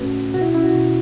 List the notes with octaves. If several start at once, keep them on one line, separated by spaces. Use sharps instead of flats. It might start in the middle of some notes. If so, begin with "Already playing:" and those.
Already playing: A2 A3 C#4 F#4 B4
C#2
B2 F#4
E4
C#4 E4
F#4
B2